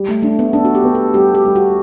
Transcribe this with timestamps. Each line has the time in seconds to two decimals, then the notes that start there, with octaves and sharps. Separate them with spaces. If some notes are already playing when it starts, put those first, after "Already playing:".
Already playing: G3
0.09 A3
0.23 A3 D4
0.39 B3
0.53 D4 A4
0.65 F#4
0.75 G4
0.84 B3
0.95 A4
1.14 G3 G4
1.35 G4
1.45 G3
1.56 F#4